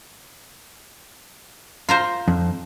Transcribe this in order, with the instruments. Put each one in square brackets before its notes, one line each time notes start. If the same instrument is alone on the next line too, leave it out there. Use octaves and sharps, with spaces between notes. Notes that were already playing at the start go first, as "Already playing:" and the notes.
[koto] F4 A#4 C5
[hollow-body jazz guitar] F2